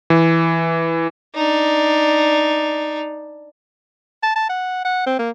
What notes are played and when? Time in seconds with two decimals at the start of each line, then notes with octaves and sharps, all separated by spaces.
0.10 E3
1.35 D4 D#4
4.23 A5
4.36 A5
4.49 F#5
4.85 F#5
5.06 C4
5.19 A#3